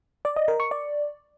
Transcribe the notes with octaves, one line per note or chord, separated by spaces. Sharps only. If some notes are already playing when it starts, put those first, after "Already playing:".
D5
D#5
A#4
C#6
D5